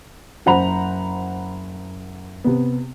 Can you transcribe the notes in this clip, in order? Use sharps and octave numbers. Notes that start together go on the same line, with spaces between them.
F#1 C5 F#5 A#5 B5 F7
C3 B3